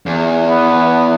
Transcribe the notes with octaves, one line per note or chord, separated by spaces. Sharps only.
E2
B3